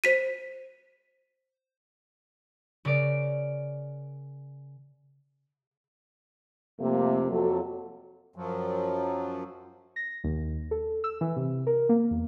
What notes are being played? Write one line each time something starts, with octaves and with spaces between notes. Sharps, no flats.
C5 B6 D#7
C#3 A#4 D5 D7
F2 C3 A3 A#3
F2 F#3 A4
F#2 F3 F#3
A#6
D#2
A4
E6
E3
C3
A#4
A#3
E2